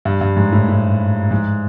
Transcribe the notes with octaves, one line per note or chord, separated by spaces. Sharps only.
G2
G2
G#2
A2
A2
G#2